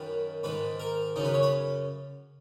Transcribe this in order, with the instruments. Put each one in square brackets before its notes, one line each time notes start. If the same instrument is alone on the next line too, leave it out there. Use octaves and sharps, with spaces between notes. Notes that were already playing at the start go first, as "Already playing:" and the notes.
Already playing: [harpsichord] F#2 D#3 B4
G#2 D#3 B4
A#4
C#3 D#4
F#2
B4
C#5
B4